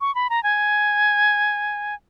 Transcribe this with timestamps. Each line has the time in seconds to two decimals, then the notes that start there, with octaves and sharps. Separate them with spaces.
0.01 C#6
0.15 B5
0.30 A#5
0.43 G#5